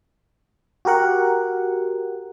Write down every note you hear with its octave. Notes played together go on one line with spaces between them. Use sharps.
F#4 G4 A#4 F#5